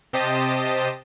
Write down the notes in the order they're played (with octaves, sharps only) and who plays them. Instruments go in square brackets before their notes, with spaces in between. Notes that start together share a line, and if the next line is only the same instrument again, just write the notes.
[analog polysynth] C3 G4 C5 D#5 A5